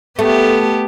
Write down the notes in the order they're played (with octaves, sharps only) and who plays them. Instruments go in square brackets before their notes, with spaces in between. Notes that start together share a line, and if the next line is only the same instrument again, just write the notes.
[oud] A3 [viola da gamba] B3 G4